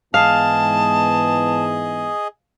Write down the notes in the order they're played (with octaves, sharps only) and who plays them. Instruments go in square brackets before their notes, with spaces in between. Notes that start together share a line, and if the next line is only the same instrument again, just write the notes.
[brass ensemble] G#2 E3 B3 [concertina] G#4 D#5 [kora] F5 [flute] A5